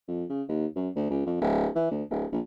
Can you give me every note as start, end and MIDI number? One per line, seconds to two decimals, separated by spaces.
0.08 0.24 41
0.29 0.42 49
0.48 0.66 39
0.76 0.89 42
0.95 1.09 38
1.10 1.24 37
1.26 1.40 41
1.41 1.68 26
1.75 1.90 52
1.91 2.03 38
2.10 2.25 26
2.32 2.40 34